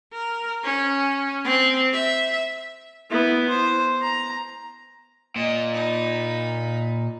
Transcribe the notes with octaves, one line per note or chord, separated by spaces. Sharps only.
A#4
C#4
C4
E5
B3 E4
C5
A#5
A#2 D#5
D#4 B5